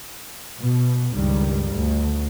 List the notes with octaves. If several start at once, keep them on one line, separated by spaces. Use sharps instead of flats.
B2
C#2 G2 D#3 G3
D2